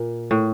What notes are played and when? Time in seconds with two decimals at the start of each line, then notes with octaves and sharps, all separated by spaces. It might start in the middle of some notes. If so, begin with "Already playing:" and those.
Already playing: A#2
0.31 A2